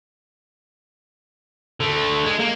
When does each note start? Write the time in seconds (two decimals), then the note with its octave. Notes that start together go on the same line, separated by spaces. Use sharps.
1.80 D3 A3
2.26 G#3
2.40 A#3